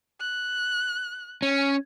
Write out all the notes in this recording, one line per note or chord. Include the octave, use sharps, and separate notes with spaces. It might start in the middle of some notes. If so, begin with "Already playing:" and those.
F#6
C#4